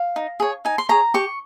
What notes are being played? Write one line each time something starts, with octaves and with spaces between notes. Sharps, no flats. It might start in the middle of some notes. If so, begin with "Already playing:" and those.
Already playing: F5
D#4
G#4 C#5
D#4 G#5
C6
G#4 C#5 A#5
G4 C#6